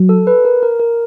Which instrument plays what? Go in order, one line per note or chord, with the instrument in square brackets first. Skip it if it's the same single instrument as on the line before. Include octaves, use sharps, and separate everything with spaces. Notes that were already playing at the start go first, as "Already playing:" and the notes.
Already playing: [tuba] F#3
[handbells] A4
B4
A#4
A#4
A#4